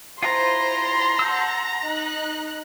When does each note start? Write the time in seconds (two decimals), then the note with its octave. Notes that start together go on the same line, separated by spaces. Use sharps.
0.23 E4 F4 C5 A#5 C6
1.19 F#5 A5 E6 G6
1.84 D#4 F#6